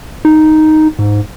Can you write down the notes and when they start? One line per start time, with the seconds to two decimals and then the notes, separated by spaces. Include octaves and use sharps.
0.25 D#4
0.99 G#2